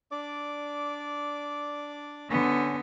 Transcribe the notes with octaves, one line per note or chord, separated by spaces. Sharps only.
D4 D5 D6
D3 B3 C#4 C#5